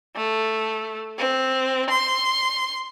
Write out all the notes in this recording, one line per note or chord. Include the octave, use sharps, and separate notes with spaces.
A3
C4
C6